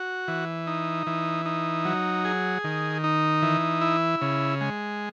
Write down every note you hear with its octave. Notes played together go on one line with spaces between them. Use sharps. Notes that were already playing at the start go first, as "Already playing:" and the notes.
Already playing: F#4
E3
D#4
E3
D#4
F#3
G#4
D#3
D#4
E3
E4
C#3
G#3